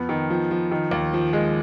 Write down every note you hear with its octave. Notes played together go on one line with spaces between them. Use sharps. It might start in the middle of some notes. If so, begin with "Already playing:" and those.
Already playing: F2 B3
D#3
F3
F3
D#3
D#2
F3
G#3